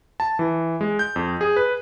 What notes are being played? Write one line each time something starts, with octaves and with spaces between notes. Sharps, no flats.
A5
E3
G#3
G6
F2
G#4
B4